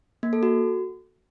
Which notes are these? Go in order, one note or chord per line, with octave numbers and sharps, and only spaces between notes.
A#3
A4
F#4